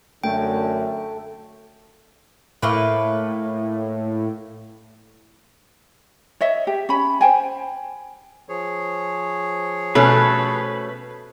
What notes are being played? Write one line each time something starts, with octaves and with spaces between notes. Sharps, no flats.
F#2 D3 A3 G5
A2 A3 A#3 B4
C#5 D#5 E5
G4
C#4 B5
C5 G5 G#5
F3 G#4 C#5
B2 A3 C#4 A4 B4